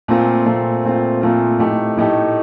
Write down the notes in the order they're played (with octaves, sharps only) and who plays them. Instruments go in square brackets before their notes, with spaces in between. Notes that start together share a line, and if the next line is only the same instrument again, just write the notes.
[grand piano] A#2 A3 C4 F4
A#2 A3 C4 F4
A#2 A3 C4 F4
A#2 A3 C4 F4
A2 A3 D#4 G4
A2 A3 D#4 G4